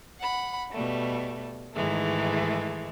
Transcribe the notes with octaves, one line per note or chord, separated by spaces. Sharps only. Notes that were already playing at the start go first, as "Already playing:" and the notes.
F#5 B5
B2 G3 A3
G#2 D#3 E3 G#3 A3